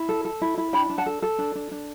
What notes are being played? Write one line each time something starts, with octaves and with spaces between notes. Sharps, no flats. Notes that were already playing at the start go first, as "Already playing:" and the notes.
Already playing: E4
A4
A4
E4
E4
D4 G5 B5
D4
F#5 A5
A4
A4
D4
D4
D4